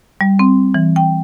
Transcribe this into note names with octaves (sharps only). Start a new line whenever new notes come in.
G3
C4
E3
G5